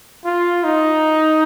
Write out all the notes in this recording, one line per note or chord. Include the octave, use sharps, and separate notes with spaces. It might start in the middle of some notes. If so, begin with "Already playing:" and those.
F4
D#4